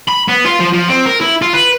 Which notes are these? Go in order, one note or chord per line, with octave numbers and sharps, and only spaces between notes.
B5
B3
F4
F3
F3
C4
A#4
E4
F4
B4